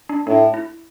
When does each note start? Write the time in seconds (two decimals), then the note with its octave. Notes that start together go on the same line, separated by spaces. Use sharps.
0.09 D4
0.27 A2 D4
0.54 E4